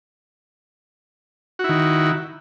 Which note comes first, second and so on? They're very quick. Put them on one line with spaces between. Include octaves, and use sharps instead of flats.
F#4 E4 D#3